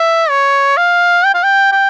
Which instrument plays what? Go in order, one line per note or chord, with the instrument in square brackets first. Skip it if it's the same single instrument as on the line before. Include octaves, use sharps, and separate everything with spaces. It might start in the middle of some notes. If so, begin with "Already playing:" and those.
Already playing: [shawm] E5
C#5
F5
G5
F5
G5
G5